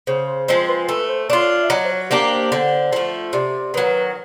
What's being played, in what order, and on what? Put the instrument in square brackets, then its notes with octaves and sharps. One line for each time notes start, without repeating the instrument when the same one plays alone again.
[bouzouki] C#3 [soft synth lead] C5
[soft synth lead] C5
[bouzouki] F3 G#3 C4 [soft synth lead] C5
[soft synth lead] B4
[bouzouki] A3 [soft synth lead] B4
[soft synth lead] C5
[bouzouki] D4 F4 [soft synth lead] C#5
[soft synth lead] E5
[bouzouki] F#3 [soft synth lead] D#5
[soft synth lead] C5
C#5
[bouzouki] A#3 D4 G4 [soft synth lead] C5
[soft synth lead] C5
[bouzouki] D3
F3 A3
[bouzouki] C3 [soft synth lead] D5
[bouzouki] D#3 F#3 [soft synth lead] B4